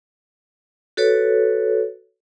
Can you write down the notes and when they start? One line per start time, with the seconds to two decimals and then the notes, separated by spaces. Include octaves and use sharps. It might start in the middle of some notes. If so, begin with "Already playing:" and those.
0.97 F#4 A4 B4 C#5